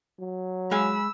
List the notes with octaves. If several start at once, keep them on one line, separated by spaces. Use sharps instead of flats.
F#3
G#3 F5 G#5 B5 E6